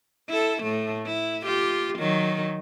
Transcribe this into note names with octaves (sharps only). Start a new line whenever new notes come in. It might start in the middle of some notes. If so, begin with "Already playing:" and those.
E4 A4
A2 A3
E4
F4 G4
D#3 F#3